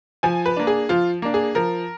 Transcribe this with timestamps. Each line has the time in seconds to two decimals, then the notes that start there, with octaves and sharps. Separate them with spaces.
0.23 F3 G#5
0.46 B4
0.57 A#3 D4
0.67 G#4
0.89 F3 F4
1.22 A#3 D4
1.34 G#4
1.55 F3 A#4